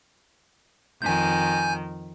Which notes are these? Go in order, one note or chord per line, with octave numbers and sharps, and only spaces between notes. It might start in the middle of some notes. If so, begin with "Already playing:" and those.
F2 D#3 G#5 G6